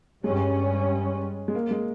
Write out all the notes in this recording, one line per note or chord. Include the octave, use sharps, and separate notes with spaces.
G2 G3 G#3 C#4
G#3
A#3
G#3